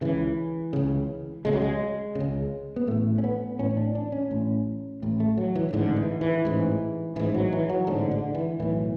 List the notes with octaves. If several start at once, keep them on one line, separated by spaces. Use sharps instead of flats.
C#2 C#3 E3
C#2 C#3
C#2 C#3 G#3
F#3
G#3
C#2 C#3
B3
A1 A2 A3
C#4
B3
A1 A2 C#4
C#4
D4
D4
C#4
A1 A2
A1 A2
A3
F#3
E3
E3
A1 G#2 D3
E3
E3
A1 G#2
A1 G#2 E3
F#3
E3
F#3
A1 G#2 D3
D3
E3
B1 A2 E3